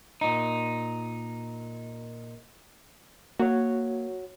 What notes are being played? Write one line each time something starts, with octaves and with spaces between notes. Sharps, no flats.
A#2 D#4
A#3 F#4 C#5